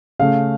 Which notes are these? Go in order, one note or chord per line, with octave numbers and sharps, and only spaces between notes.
C#3 A3 F5